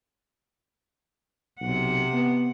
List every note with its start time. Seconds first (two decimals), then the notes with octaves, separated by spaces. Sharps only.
1.61 B1 C3 F#5
2.13 B3